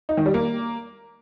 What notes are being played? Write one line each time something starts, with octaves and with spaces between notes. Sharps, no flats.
D#4
D#3
G3
A#3